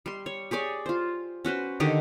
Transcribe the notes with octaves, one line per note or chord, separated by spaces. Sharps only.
G3 C6
C#5
G4 G#4 C#5 D5
F4 C5
C#4 F#4 B4 C5
D3 D#3 G4 D#5